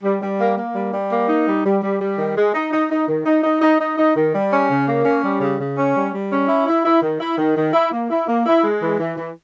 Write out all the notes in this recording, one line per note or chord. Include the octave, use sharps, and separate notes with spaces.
G3
G3
A#3
A#3
G3
G3
A#3
D#4
G3
G3
G3
G3
D#3
G#3
D#4
D#4
D#4
D#3
D#4
D#4
D#4
D#4
D#4
D#3
G3
C#4
C#3
A#3
C#4
G3
C#3
C#3
C#4
G3
G3
C#4
E4
E4
E4
D#3
E4
D#3
D#3
E4
A#3
E4
A#3
E4
G#3
E3
E3
E3